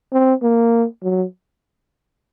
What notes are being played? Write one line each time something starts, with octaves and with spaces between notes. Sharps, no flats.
C4
A#3
F#3